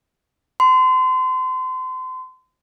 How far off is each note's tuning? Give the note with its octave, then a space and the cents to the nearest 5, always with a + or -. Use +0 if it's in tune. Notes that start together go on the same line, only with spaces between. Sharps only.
C6 -35